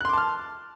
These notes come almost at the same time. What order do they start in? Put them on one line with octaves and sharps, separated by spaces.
F#6 C6 D6 A5 F6